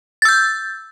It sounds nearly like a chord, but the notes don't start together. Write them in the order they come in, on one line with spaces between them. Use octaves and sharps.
A6 E6 G6